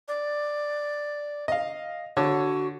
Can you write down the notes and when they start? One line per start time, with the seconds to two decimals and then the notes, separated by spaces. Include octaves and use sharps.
0.08 D5
1.48 D#5 F5
2.17 D3 F#4 C#5